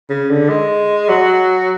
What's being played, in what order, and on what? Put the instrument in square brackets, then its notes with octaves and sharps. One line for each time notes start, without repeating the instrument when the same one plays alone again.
[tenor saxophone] C#3
D3
G#3
F#3